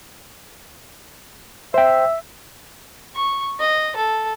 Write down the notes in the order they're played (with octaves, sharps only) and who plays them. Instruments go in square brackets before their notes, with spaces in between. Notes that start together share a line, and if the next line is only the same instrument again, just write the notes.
[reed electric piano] C5 G5 [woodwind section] E5
[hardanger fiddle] C#6
D#5
A4